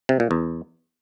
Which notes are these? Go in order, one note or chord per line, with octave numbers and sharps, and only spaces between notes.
C3
A#2
E2